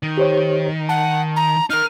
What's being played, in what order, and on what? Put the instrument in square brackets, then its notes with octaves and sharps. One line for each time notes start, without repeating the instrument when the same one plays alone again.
[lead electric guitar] D#3
[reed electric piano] G4 C5 C#5
[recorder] F#5 [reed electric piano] A5
[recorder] A#5
[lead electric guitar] D#4 A#4 [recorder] F6